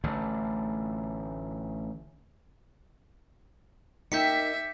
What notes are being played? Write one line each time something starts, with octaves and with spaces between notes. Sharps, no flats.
A1 D3 A3
A#3 D#4 G4 E5 G6 B6 C#7